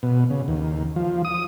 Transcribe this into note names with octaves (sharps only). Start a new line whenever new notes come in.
B2
C#3
D#2
F3
D#6